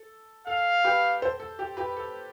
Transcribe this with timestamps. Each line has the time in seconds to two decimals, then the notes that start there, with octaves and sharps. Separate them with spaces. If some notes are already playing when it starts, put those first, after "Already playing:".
Already playing: A4
0.47 A4 F5
0.84 G4 B4
1.22 A4 C5
1.40 A4
1.59 G4
1.77 G4 B4
1.97 A4